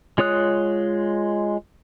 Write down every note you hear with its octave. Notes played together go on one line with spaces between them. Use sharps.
G#3 F4 C#5 D#6 F#6